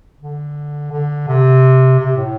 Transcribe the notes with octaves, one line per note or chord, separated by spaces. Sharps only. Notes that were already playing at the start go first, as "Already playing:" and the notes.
D3
D3
C3
C3
A2